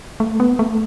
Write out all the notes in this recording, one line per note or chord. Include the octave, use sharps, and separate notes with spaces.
A3
B3
A3